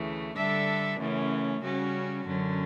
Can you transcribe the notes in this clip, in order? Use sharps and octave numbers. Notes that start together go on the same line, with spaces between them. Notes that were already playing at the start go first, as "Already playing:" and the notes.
Already playing: D2 C#3 E3 A3
D3 G3 D4 A4 E5
F#2 C#3 E3 A3 C#4
C#3 G3 C#4 F#4
F#2 D3 F#3 C#4